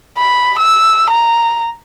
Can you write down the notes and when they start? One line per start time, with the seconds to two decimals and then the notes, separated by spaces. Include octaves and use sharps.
0.18 B5
0.59 E6
1.10 A#5